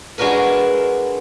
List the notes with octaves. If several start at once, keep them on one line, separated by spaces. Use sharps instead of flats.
G#3 D4 F#4 A#4 B4